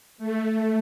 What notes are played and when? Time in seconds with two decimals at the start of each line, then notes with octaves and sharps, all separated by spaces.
0.18 A3